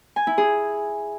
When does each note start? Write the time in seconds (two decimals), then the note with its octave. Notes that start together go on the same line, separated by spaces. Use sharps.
0.16 G#5
0.27 E4
0.38 G#4